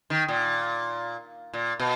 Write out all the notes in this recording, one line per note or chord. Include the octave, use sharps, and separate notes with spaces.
D#3
A#2
A#2
B2